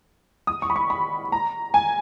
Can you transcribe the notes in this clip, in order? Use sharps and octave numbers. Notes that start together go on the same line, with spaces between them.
D#6
C#6
B5
C#6
B5
A#5
G#5